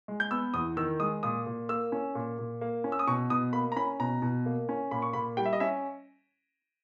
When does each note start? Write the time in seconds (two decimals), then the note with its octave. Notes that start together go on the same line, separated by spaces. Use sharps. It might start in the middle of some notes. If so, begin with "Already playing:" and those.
0.08 G#3
0.20 G6
0.31 B3 E6
0.54 E2 D#6
0.77 D#3 E6
1.00 G#3 D#6
1.23 A#2 D#6
1.46 A#2
1.69 A#3 E6
1.92 C#4
2.15 A#2
2.38 A#2
2.61 A#3
2.84 C#4
2.92 E6
2.99 D#6
3.07 B2 C#6
3.30 B2 D#6
3.53 A#3 B5
3.72 A#5
3.76 C#4 B5
3.99 B2 A#5
4.22 B2
4.46 A#3
4.69 C#4
4.91 A#2 B5
5.02 C#6
5.13 A#2 B5
5.37 G3 G5
5.46 E5
5.53 D#5
5.60 C#4 E5